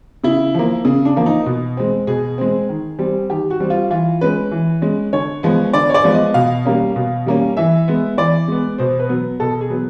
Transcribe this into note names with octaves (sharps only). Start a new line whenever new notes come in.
C#3 E4
F3 A#3
C#3
D4
F3 A#3
D#4
B2
G#3 C4
B2 G#4
G#3 C4
D#3
G3 C4
D#3 G4
F#4
G3 C4
F4
E3 F4
G#3 C#4 B4
E3
G#3 C#4
D3 C#5
F3 G#3 B3
D3 D5
C#5
D5
F3 G#3 B3
D#5
B2 F5
G3 A#3 C#4
B2
G3 A#3 C#4
E3 E5
G#3 B3
E3 D5
G#3 B3
B2 C5
B4
F#3 B3
B2 A4
G#4
F#3 B3